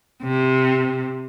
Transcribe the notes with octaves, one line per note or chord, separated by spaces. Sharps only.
C3